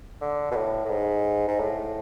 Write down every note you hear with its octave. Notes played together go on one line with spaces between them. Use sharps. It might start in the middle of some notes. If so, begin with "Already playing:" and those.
D3
B2
A2
A2
G#2
G#2
A2